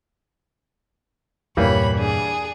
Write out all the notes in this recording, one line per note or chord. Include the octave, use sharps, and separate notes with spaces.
E2 G2 A#2 E3 G3 A#3 C#5 B5
D4 G#4